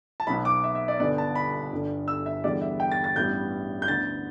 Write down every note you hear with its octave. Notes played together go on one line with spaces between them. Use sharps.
A5
B1 B2 B3 B5
D6
E5
E5
D5
G1 G2 D3 B3 D5
A5
B5
G1 G2 D3
E6
E5
E2 D3 G3 B3 D5
E5
G5
A6
A6
A1 G2 G3 B3 G6
G6
D2 D3 B3 A6